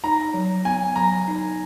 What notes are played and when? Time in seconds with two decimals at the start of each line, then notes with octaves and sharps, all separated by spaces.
0.04 D#4 A#5
0.34 F#3
0.65 B3 G#5
0.96 F#3 A#5
1.28 D#4